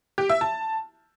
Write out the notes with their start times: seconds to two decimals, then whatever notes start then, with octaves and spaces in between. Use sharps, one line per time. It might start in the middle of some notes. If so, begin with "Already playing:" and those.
0.18 G4
0.29 E5
0.41 A5